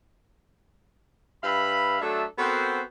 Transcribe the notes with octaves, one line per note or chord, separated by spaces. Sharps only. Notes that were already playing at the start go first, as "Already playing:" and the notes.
G2 B4 E5 F5 B5
F#3 A3 D4 A4 E5
B3 C4 F#4 A4 A#4 C5